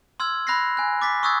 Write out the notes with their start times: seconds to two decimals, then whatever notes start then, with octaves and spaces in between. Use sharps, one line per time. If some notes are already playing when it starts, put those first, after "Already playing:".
0.20 C6 E6 F6 G#6
0.47 B5 F#6 A#6 C7
0.77 G#5 F#6
1.01 D6 A6 B6
1.23 C#6 D#6 E6 F#6 G#6 A6